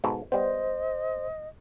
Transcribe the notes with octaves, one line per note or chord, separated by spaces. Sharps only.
G#2 B2 A4
G3 B3 C5 D#5